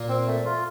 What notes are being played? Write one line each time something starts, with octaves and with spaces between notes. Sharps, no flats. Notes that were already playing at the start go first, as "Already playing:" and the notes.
Already playing: A#2 A#3
C4
A3
F4